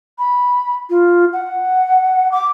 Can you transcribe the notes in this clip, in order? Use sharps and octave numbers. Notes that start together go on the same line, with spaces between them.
B5
F4
F#5
D6